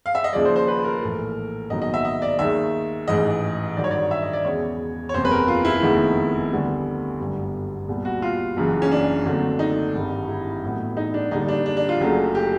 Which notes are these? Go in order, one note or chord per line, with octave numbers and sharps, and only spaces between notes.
F5
E5
D#5
D#2 C#3 F3 G#3 D5
C5
C5
B4
A#4
A#1 A2 E3 A3
A#1 G#2 D#3 F#3 B3 D#5
D#5
E5
D#5
D5
D#2 D#3 G#3 E5
A1 G#2 E3 D#5
G2 D#3 F#3 D5
C#5
D5
E5
D#5
D5
E1 E2 C#3 C#5
C#5
F#1 E2 C3 C5
B4
A#4
F4
E4
F1 D#2 D#3 G#3 B3
D2 D3 G3 B3
G1 F#2 D3 G3
C2 A#2 G3 B3
F#4
F4
F#1 F#2 C#3 E3
C#4
D4
D#2 D3 F#3 A3 C4
D#4
G#1 G2 D#3 G3
E4
A1 A2 F#3 B3
D#4
D4
D#2 D3 G3 D#4
D4
D4
D4
F4
F#1 F#2 C#3 F#3 A3
G4